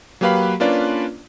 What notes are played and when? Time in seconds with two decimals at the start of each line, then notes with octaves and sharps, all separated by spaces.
0.21 F#3 A#3 G4 B4 F5 B5
0.60 A#3 C#4 D4 F4 B4 D5